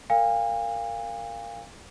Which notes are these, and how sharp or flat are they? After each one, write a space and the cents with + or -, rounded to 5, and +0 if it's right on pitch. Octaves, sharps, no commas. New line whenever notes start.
A#4 -10 F5 +0 G#5 -45